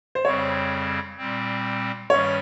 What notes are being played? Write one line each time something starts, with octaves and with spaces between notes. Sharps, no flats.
C5
F2 C#3 G3 C4 C#5
A#2 G3 C4
G2 D#3 G3 C#4 C#5